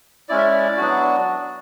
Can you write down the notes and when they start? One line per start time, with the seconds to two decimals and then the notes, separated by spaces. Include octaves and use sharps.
0.29 G#3 C#4 E4 D5
0.38 E5
0.46 D5
0.77 F#3 B3 D4 F#4